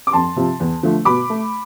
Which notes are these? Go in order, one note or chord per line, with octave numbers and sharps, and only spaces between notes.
D6
F2 A5 C6
C3 F3
E2
D3 F3 A3
B2 B5 D6
A3